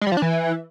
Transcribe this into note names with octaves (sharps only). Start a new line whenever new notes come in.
G#3
G3
F3
D4
E3